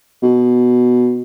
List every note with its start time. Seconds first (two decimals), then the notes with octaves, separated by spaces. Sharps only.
0.22 B2